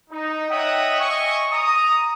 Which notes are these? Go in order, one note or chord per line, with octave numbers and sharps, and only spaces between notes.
D#4
C#5 D#5 E5 F#5 G5 D#6
D#5 E5 G#5 C#6
A#5 D#6